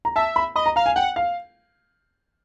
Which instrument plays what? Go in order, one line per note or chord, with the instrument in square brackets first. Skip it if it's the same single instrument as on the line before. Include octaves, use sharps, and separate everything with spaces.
[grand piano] A#5
[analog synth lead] E5 [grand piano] A5
[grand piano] B5
[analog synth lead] D#5 [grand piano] B5
[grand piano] A#5
[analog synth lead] F5 [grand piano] A#5
[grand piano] G#5
[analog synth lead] F#5 [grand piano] G5
[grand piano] F5